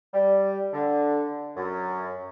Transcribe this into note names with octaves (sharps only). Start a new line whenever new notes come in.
G3
D3
F#2